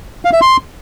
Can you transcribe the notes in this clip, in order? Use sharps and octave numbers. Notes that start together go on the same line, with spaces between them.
F5
E5
C6